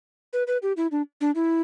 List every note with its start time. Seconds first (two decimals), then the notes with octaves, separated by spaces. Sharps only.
0.33 B4
0.47 B4
0.62 G4
0.77 E4
0.92 D4
1.21 D4
1.35 E4